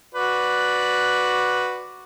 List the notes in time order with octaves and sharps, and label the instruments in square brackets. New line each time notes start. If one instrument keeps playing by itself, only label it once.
[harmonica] F#4 B4 D5